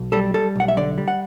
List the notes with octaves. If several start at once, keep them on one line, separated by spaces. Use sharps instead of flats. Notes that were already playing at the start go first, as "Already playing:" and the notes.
Already playing: B1
G3 A4
G3 A4
B1 F#5
E5
D3 D5
G3
F#5